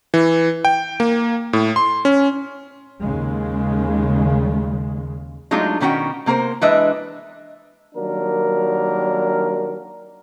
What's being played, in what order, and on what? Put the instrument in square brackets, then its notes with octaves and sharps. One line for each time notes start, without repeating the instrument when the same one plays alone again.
[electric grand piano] E3
G5
A#3
A2
C6
C#4
[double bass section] D#2 C#3 G#3
[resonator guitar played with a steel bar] F#3 G#3 A3 D4 D#4 F4
B2 D#3 C#4 F#4 G5
C3 A#3 F#4 A#4 C5
E3 G#3 D4 B4 D#5 E5
[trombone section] D#3 F#3 G3 A#3 D4 A#4